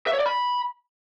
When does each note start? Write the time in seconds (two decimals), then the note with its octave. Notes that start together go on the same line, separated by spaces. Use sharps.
0.07 E5
0.13 C#5
0.19 D5
0.26 B5